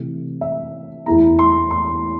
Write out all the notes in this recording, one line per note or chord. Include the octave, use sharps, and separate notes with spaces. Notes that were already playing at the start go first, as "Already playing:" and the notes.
Already playing: C3 E3 A3 C4
E5
E2 E3 A3 E4 A#5
C6
C6